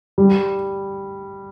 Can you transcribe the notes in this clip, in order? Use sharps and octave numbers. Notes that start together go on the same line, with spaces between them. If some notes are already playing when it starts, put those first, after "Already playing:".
G3